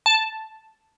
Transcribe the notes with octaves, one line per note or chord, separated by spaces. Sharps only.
A5